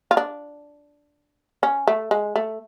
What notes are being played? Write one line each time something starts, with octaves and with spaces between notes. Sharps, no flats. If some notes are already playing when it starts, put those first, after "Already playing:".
F4
D4
C#4
A3
G#3
A3